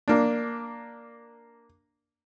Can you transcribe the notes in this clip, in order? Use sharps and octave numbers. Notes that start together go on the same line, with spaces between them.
A#3 D4